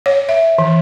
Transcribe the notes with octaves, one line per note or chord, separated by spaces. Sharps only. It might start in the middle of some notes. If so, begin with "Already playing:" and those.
C#5
E5
E3